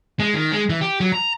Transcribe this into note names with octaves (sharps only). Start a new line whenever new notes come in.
G#3
D#3
G#3
E3
G4
F#3
A#5